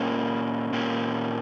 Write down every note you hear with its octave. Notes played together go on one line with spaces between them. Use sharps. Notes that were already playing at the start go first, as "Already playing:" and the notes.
Already playing: A#2 A#3 C#4
A#2 A#3 C#4